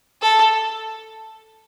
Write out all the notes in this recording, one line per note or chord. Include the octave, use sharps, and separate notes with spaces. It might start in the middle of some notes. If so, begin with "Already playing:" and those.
A4